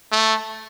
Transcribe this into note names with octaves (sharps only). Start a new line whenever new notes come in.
A3